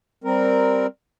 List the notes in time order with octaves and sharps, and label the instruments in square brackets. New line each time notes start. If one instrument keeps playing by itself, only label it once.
[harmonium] G3 C4 A#4